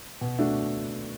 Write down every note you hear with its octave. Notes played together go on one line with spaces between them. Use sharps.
B2
A3 D4 F#4